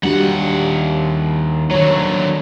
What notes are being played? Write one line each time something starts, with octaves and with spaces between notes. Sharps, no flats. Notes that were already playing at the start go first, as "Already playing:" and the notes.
D#2 G3 D4 F#4 F#5
D3 D#3 F#3 C#5